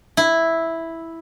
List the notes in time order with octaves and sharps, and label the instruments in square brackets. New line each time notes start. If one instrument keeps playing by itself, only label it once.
[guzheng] E4